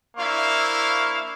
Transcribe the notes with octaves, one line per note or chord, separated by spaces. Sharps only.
A#3 D4 E4 C5 F5 C#6